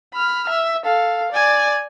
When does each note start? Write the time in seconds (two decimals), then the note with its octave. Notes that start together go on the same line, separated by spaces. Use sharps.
0.14 B5 F6
0.49 E5
0.85 A4 F5
1.32 D5 G#5